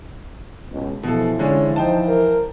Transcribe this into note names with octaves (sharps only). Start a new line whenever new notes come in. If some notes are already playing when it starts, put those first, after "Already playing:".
C#2 B2
B2 E3 F3 A4
D3 G#3 C#4
D#4 C5 G5 A5
A#4